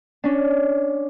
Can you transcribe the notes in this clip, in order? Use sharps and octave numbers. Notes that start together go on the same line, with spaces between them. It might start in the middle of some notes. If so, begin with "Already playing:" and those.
C#4 D4